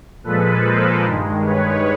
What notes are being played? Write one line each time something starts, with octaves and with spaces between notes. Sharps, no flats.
A#2 F3 G#3 A4 B4
A#4 C5
G2 D#3 G#3
B4 C#5